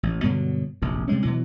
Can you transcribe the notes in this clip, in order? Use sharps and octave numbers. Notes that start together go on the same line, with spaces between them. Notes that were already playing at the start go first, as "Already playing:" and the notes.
A1
G2 B2 D3 F#3
F1 A#1 F#2
C3 G3 G#3 C#4
B2 E3 F#3